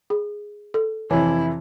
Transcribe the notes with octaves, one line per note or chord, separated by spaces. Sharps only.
G#4
A4
F2 C3 E3 E4 C#5